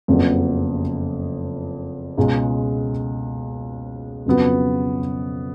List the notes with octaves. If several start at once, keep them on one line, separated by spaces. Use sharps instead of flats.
F#1 F2 C#3 F#3 B3
C#2 B2 G#3
F2 C#3 F#3 B3 F#4